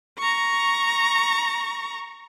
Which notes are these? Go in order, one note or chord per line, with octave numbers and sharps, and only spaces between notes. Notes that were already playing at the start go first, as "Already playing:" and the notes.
A#5 C#6